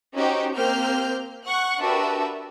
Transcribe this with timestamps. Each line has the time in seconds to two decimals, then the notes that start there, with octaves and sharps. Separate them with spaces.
0.15 C#4 D#4 F#4 G4 C5
0.56 A#3 C4 G4 F6 G6
1.46 F#5 C#6 F#6
1.81 D4 F#4 G4 A#4 B4 E5